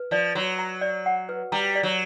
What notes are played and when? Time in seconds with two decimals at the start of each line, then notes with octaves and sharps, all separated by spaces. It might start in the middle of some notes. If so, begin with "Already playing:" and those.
Already playing: B4
0.11 F3 D5
0.35 F#3 F#4
0.59 A#5
0.81 D5
1.06 F#5
1.29 B4
1.52 G3 A#5
1.75 D5
1.83 F#3